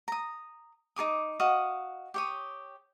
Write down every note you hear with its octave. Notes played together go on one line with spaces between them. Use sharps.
A#5 D#6
D#4 A4 D6 D#6
F#4 D#5 F5 D#6
G4 C#5 D#6